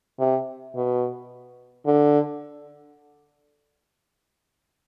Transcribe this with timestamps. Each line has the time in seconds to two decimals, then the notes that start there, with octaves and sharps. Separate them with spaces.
0.19 C3
0.75 B2
1.86 D3